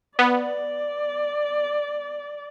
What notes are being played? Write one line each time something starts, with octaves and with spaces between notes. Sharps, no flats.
B3 D5